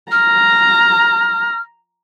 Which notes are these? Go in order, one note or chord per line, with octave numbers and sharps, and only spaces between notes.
A#5 F6